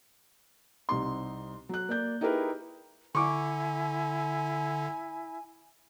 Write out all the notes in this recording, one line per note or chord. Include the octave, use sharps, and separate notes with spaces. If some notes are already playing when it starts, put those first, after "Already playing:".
C2 C3 D#4 C6
F#3 F#6
A#3 D5 G6
D#4 E4 G4 G#4 A#4 B4
D3 E4 G#5 C#6 D6